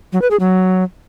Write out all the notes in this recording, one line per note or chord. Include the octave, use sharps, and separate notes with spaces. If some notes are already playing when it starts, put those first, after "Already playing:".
F#3
B4
G#4
F#3